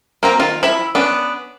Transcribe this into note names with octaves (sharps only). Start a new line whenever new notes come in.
A#3 C4 A#5
D#3 F4
E4 E5 B5
B3 C#4 D4